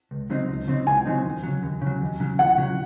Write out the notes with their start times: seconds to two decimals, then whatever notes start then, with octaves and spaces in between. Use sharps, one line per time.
0.11 C#2
0.30 C#3 F#3 C4 D#4
0.49 C#2
0.68 C#3 F#3 C4 D#4
0.87 C#2 G#5
1.06 C#3 F#3 C4 D#4
1.25 D#2
1.43 C#3 F#3
1.63 D#2
1.82 C#3 F#3
2.01 D#2
2.20 C#3 F#3
2.39 D#2 F#5
2.58 C#3 F#3